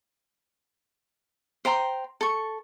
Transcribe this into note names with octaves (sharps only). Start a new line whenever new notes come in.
C5 G5 A#5 C6
A4 C#6